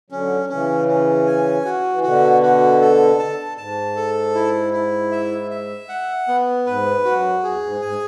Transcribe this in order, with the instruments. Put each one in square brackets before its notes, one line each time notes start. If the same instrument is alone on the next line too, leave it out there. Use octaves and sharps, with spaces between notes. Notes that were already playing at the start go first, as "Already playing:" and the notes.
[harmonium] D3 F#3 [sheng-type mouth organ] C#4
[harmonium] C#3 E3 [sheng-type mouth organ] C#4
[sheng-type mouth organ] C#4
G#5
F#4
[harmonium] E3
[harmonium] B2 D3 [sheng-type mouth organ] F#4
[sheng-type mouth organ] F#4
A4
A5
[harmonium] G#2 [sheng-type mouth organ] A5
[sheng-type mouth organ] A4
E4
E4
E5
E5
F#5
B3
[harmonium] G#2 [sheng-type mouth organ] B4
[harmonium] F#2 [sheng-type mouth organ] F#4
[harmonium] F#2
[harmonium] E2 [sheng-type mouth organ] G#4
[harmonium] G#2
[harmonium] G#2 [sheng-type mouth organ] G#5